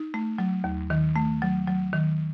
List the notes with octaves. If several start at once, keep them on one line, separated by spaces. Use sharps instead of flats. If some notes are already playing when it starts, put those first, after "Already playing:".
Already playing: D#4
A3
F#3
D#2
D#3
A3
F#3
F#3
D#3